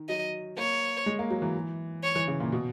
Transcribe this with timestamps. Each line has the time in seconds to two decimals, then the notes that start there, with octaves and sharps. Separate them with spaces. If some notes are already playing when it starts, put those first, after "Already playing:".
Already playing: D#3
0.09 F#3 D#5
0.57 A#3 C#5
1.06 G#3
1.19 A#3
1.30 F#3
1.42 E3
2.03 C#5
2.16 E3
2.28 C#3
2.40 A#2
2.52 B2